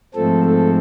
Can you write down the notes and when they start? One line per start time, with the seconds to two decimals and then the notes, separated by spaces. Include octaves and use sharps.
0.14 G#2 F3 A3 C4 A4
0.44 A4